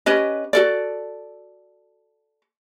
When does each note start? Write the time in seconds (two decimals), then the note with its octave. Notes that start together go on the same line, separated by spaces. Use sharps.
0.06 C#4 G4 B4 D#5
0.53 F#4 A4 D5